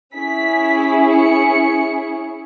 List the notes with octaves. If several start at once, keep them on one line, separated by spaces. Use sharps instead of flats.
C#4 E4 G#4 B6
C#7